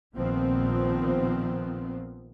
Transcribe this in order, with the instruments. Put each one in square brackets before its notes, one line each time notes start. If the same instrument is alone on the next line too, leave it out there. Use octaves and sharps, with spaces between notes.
[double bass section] A#1 A#2 D#3 F3 B3 C4